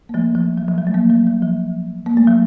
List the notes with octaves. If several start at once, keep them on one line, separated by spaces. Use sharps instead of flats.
A#3
F3 A3
F3
F#3
F3
F#3
A3
F#3 A#3
F#3
F#3
F3
A#3
A3
F#3